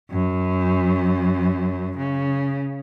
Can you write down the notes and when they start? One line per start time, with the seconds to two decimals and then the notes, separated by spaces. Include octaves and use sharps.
0.11 F#2
1.98 C#3